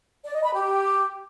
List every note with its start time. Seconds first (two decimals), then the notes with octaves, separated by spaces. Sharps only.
0.24 D5
0.34 D#5
0.43 B5
0.53 G4